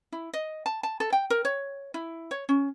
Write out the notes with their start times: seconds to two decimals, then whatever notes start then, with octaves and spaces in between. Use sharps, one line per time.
0.12 E4
0.33 D#5
0.66 A5
0.83 A5
1.00 A4
1.12 G5
1.30 A#4
1.45 C#5
1.94 E4
2.31 C#5
2.49 C#4